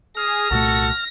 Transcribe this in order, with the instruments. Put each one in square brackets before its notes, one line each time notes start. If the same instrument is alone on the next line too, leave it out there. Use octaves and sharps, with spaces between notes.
[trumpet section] G#4 [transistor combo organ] F6 [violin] A#6
[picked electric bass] C2 A#2 A3 [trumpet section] F#4 A4